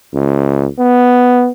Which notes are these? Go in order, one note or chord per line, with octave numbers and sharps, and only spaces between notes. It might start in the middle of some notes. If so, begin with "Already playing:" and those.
C#2
B3